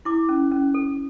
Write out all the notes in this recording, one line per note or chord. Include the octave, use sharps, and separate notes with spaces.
E4 D6
C#4
C#4
A4